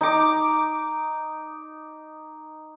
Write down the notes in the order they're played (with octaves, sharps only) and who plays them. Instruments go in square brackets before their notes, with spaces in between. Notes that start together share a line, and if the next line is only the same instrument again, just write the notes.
[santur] D#4 A#5 D6